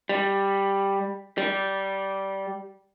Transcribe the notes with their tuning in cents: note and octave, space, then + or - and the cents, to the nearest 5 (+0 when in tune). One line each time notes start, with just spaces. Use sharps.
G3 +5
G3 -15